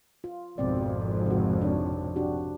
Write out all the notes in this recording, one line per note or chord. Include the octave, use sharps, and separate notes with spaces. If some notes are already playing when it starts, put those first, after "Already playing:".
F4
G#1 F2 B2 C4 D5
C3 F#4
D4 C#5
D4 F#4 G4